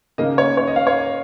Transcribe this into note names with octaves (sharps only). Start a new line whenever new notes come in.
C#3 A#3 D#4 D#5
C#5
C#5
D#5
F5
C#5